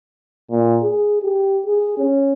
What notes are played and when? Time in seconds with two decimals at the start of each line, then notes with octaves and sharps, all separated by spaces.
0.50 A#2
0.82 G#4
1.22 G4
1.66 G#4
1.98 C#4